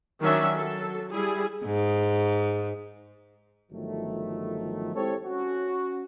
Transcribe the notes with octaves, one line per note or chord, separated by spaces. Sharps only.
D#3 F#3 C#4 D4 E5
F#3 A4
G3 E4 G#4
G#2
G1 D#3 F3 F#3 A3
G#3 C4 E4 G4 A4 C#5
C#4 F#4